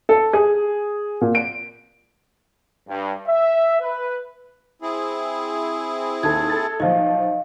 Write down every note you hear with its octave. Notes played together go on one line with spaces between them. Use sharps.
A4
G#4
A#2
D7
G2
E5
B4
C4 E4 G#4
D#2 A4 A5 G#6
A4 A6
B1 F3 D#5 F5